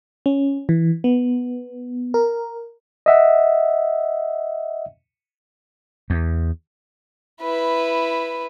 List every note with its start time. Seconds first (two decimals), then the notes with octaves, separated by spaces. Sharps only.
0.26 C#4
0.69 E3
1.04 B3
2.14 A#4
3.06 D#5 E5 F#5
6.10 E2
7.41 E4 B4